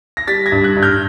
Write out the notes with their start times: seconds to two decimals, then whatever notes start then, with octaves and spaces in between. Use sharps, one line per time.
0.17 A#6
0.27 G3 A6 B6
0.46 G#6 A#6
0.52 G2
0.64 F#6 G#6
0.77 G2
0.83 F6 G6